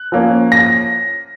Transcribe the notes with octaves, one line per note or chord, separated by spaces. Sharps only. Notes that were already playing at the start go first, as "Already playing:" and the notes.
Already playing: F#6
F3 A#3 C#4
A#6